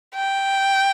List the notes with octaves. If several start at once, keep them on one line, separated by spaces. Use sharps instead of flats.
G5